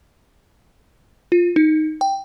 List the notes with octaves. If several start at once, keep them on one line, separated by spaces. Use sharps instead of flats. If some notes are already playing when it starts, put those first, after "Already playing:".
F4
D#4
G5